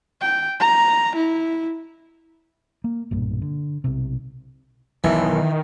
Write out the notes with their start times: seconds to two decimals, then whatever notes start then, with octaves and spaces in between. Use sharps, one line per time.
0.21 G5
0.60 A#5
1.16 E4
2.84 A#3
3.11 B1 G2 A#2
3.42 D3
3.84 B1 C3
5.04 B1 E2 D#3 E3